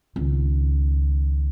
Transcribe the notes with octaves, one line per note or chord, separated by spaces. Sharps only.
C#2 D#3